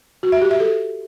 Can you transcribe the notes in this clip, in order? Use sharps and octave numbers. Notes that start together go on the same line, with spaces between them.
F#4
E5
G4
E5
A4